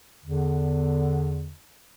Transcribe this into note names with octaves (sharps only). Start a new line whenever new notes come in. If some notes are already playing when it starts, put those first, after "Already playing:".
E2 D3